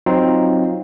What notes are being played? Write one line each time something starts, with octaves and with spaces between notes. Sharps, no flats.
F#3 C4 D#4 F4